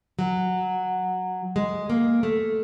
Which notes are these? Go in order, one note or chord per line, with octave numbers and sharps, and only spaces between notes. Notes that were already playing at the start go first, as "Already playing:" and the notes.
F#3
G#3
A#3
A3